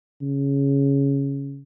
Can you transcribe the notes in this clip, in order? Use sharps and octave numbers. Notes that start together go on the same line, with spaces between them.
C#3